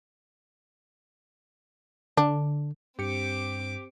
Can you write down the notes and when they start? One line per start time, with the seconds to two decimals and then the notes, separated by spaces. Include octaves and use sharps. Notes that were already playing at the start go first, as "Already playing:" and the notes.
2.17 D3 D4
2.99 G2 C4 G4 D6 C#7